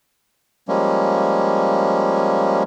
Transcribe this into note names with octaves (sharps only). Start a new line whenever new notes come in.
F3 G3 G#3 A#3 C#4